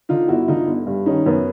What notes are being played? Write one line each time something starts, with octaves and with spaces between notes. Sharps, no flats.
D3 D#4 F4
G1 E4 F#4
D3 D#4 F4
G1
G2
D#3 C#4 D#4
F#2 B3 C#4